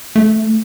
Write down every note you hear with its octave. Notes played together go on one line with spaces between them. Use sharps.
A3